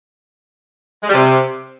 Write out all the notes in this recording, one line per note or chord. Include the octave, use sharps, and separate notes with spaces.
G#3
G3
C3